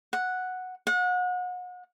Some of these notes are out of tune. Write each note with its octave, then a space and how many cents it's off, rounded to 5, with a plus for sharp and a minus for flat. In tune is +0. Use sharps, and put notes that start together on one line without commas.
F#5 -5
F#5 -35